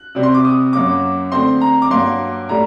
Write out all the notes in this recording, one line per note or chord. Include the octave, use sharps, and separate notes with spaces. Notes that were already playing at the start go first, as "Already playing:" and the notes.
Already playing: F#6
C3 G3 C4
C6
D6
D#6
F#2 F#3 A#3 D6
D3 A3 C4 C6
A#5
D6
G2 F#3 A#3 C6
A2 G3 A#5